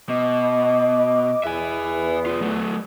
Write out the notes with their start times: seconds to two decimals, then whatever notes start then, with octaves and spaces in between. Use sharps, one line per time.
0.09 B2 D#5 D6
1.44 E2 B3 E5 G#5
2.26 B1 F4
2.41 F#3 A3